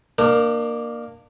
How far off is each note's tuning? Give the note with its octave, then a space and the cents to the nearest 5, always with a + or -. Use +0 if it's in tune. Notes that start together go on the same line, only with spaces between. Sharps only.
A#3 +0 D4 +40 A#4 +0